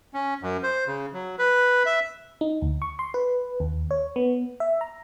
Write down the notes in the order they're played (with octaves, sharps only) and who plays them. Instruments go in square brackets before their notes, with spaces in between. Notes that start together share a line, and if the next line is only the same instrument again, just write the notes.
[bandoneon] C#4
F#2
C5
C#3
F#3
B4
E5
[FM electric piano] D#4
D2
C#6
C6
B4
D#2
C#5
B3
E5
A#5